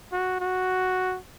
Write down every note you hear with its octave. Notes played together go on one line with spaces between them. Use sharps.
F#4
F#4